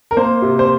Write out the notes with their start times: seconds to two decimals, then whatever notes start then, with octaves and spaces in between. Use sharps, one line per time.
0.11 A#4
0.17 A#3 C5
0.42 C3
0.59 C5